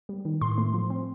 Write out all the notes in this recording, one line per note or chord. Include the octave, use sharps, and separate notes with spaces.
G3
D#3
A2 C6
A3
F3
C4